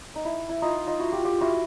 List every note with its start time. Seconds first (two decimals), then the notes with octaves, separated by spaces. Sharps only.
0.15 D#4
0.25 E4
0.49 E4
0.62 D#4 F4
0.87 D#4 F4
0.99 E4 F#4
1.12 F4 G4
1.24 F4 G4
1.41 E4 F#4